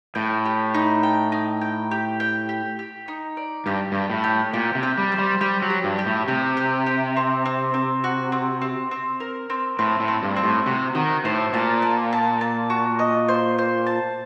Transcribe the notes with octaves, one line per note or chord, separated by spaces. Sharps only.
A2 G5
G4
D#4
G5
D#4
G5
G4
G5
G4
G4
D#4
D5
G2 G4
G2 G4
A2
G4
A#2 G4
C3
G4
G3
C5
G3
G3 G4
F#3
G4
G2
G4
A2
C3 G4
G4
G4
C4
C4
C4
F#4
C4
C4
C4
A#4
C4
A2 C4
A2
C4
G2
C4
A2
C3 F#4
D#3 F#4
A2 C5
A#2 A5
A5
A5
A5
F#4
D#5
C5
C5
A5